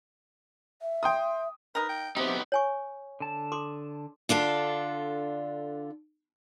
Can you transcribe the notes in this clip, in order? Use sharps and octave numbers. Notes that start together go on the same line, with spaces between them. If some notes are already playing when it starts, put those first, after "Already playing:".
E5
G5 C6 D#6
D#4 A#4 B4
G5
B3 C4 D#4 E4 G4
C#5 G#5 C#6
D3 A5
A4 C6 D6
D3 D4 F4 A4